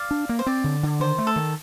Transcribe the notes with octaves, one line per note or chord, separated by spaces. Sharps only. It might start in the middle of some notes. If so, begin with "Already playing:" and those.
Already playing: D5 F5
D4
A#3
C5
C4 D5
D3
D3
D#3 C5
A3
A4
D#3